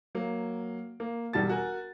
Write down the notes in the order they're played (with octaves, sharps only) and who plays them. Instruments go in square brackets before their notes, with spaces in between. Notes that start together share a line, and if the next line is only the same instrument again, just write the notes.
[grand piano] F#3 A#3
A#3
E1 G3 F#4 A5 A6
F#4 A#4 G#5